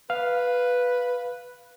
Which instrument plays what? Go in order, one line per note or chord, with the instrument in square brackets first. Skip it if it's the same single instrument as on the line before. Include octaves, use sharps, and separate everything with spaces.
[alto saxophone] B4 [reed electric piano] F5